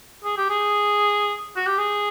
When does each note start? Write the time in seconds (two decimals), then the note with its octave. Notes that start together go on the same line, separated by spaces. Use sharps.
0.24 G#4
0.37 G4
0.49 G#4
1.56 F#4
1.67 G4
1.78 G#4